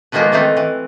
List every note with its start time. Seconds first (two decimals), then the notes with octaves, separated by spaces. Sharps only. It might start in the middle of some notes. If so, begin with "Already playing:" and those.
0.12 D3 D#3 F3 G#3 A#3 B3
0.32 D#3 E3 A3 C4 D#4
0.57 E3